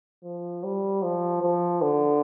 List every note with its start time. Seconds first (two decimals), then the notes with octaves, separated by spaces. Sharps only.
0.24 F3
0.63 G3
1.03 F3
1.42 F3
1.82 D3